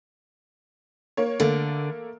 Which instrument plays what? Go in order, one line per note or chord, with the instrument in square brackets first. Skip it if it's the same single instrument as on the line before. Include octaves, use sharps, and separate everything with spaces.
[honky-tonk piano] A#3 C#5
[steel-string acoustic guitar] D3 [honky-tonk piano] A3 A#3